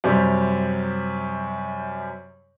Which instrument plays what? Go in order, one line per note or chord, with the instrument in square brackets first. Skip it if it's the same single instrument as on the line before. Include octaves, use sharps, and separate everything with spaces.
[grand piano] F#2 C3 G3